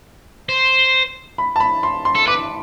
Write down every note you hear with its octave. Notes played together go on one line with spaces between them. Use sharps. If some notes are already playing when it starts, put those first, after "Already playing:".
C5
B5
A5
B5
C6
C6
A4
B4 D6